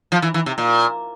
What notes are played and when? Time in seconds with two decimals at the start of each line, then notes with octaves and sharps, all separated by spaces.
0.12 F3
0.22 E3
0.34 E3
0.46 C3
0.58 A#2